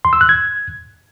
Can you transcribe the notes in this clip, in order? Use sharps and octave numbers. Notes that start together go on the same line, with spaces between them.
C6
E6
F#6
G#6